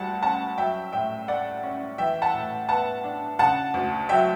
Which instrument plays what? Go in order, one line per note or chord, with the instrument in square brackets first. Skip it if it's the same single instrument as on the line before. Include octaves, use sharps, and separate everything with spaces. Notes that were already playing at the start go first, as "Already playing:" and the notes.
Already playing: [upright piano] D2 G3 F#5 A5
C#4 F#5 A5
F#3 E5 G5
A2 E5 G5
A3 D5 F#5
C#4
E3 E5 G5
F#5 A5
A2
B3 F#5 A5
D4
C#3 F#5 A5
D2
F#3 E5 G5